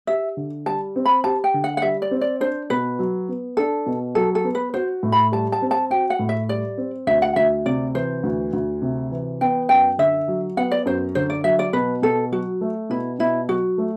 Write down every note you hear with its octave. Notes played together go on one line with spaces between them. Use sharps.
G4 E5
D3
G3 A5
C4
B5
G4 A5
G5
D3
F#5
F#5
G3 E5
D5
C4
D5
D4 C5
B2 B4
F#3
B3
D4 A4
B2
F#3 A4
A4
B3
B4
F#4 C5
A2
B5
G3 A5
A5
C4
A5
F#4 G5
F#5
A2
E5
G3 D5
C4
D2 E5
F#5
D2 E5
C3 D5
E3 C5
D2
D2
C3
E3
B3 G5
F#2 G5
D3 E5
F#3
B3 F#5
D5
F#2 C5
D3 C5
D5
F#3 E5
D5
B2 B4
B2 A4
F#3 F#4
A3
B2 E4
B2 E4
F#3 F#4
A3